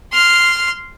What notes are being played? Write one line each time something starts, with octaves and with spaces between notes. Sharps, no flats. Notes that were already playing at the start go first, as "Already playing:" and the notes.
C6 F6